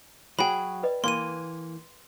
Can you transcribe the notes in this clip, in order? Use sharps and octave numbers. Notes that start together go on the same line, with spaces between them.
F#3 F#4 G#4 G5 B5
B4 D5 D#5
E3 A#3 C6 D#7